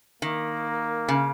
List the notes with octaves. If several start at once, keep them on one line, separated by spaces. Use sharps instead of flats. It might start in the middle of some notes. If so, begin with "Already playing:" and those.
D#3 A#3
C#3